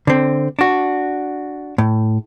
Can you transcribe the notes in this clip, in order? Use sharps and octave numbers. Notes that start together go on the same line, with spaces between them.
D3 C4
D4 F#4
A2